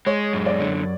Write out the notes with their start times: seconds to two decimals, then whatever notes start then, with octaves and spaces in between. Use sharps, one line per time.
0.06 G#3 C#5
0.33 F#2
0.46 D5
0.60 D3